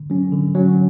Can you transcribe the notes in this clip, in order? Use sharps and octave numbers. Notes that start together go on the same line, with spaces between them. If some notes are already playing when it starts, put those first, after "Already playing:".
Already playing: D3
F#3 C#4
D3
F#3 C#4